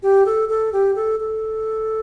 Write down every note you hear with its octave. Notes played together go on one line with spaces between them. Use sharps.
G4
A4
A4
G4
A4
A4